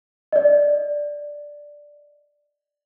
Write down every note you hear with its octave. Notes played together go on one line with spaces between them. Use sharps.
D5 D#5